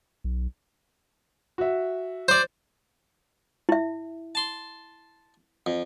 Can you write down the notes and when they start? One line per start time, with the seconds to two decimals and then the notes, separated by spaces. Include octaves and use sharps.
0.24 B1
1.58 F#4 E5
2.28 C5 D5
3.69 E4 E5
4.35 A5 C6
5.66 F2